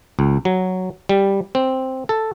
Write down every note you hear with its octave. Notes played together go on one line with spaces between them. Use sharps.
C#2
F#3
G3
C4
A4